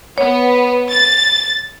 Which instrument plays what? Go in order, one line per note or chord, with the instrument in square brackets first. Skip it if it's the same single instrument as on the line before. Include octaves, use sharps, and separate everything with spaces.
[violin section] B3 [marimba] C#5
[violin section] A6